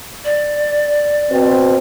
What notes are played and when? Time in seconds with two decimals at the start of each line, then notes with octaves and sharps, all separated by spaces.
0.25 D5
1.30 B2 C4